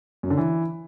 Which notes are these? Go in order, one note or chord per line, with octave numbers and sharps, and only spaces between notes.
F#2
D3
E3